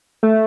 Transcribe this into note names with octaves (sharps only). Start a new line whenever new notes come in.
A3